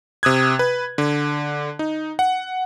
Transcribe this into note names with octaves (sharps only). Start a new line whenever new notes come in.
C3 D#6 F#6 G#6
B4
D3
D#4
F#5